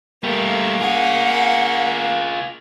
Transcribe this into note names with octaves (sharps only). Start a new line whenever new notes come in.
G3 A3 A#3
F4 G#4 F#5